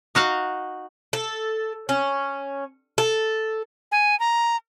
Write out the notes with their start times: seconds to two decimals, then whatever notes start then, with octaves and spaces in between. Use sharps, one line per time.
0.15 D#4 F#4 F5 F#5
1.13 A4
1.89 C#4
2.98 A4
3.92 G#5
4.20 A#5